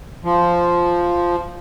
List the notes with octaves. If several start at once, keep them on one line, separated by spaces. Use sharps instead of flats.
F3